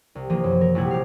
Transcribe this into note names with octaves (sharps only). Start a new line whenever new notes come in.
C2
E3 F3 A#3 F4
F#2
A#4
A#1 C3 G3 E4 F#5 G#6
G4 F5